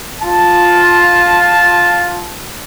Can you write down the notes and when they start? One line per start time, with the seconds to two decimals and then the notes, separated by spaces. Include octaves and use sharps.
0.20 F4 A5